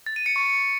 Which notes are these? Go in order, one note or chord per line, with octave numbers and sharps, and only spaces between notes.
A6
D#7
C#7
C#6